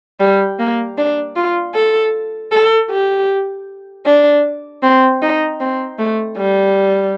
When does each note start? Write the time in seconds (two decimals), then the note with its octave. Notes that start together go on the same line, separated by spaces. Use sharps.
0.20 G3
0.59 A#3
0.98 D4
1.36 F4
1.75 A4
2.52 A4
2.90 G4
4.06 D4
4.83 C4
5.22 D#4
5.60 C4
5.99 A3
6.37 G3